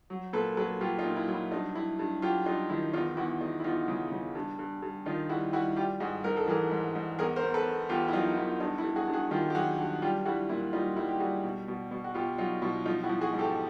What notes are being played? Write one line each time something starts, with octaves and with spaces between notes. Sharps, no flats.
F#3
A#2 A4 B4
F#3 A4 B4
F#3 F4 G4
D#4 F4
A#2
E4
F#3
E4
G2 D#4
G2 E4
G2
F#3 F4 G4
G2 D#4 F4
D#3 E4
E2 D#4 F4
E2 E4 F#4
E2 D#4
E4
E2 D#4 F4
C#3
C#3
G2
G2
G2
D#3 D#4 F4
G3 E4 F#4
G3 E4 F#4
G3 F4 G4
G#2 F#4 G#4
G#2 A#4
A4
E3 G#4 A#4
G#2
G#2
E2 G#4 A#4
A#4 C5
E2
A4 B4
E2
E2 F4 G4
E4
F#3 D#4 F4
E2 E4
G2 D#4
E4
G2
F#4 G#4
G2
F#4 G#4
D#3 F4 G4
G4
F#3 F#4 G#4
G2
G3 F4 G4
G3 E4 F#4
A#2 E4
G3 D#4 F4
G3 E4
G4
G3 F#4 G#4
B2
B2
B2
F#4
B2 F4 G4
F#3 D#4 F4
B2 E4
F3 D#4 F4
E4 F#4
F3
F#4 G#4
G#2
G4 A4